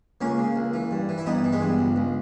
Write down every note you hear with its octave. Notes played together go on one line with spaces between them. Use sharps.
C#2 A#3 C#4
C#3
C#2
E3
G2
E3
E4
G2 B3 D#4
E3
G#3 B3
G2
C#2
C#2